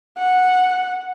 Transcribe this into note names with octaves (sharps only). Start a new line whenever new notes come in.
F#5